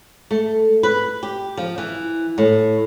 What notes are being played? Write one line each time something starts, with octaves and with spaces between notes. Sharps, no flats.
A3
B4
G4
F3
E3
A2